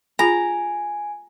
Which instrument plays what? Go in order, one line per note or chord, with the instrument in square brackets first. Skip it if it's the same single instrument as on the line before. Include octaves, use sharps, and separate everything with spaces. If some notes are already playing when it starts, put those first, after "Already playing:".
[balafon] F4 G#4 B5 [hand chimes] G#5 [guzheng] A#5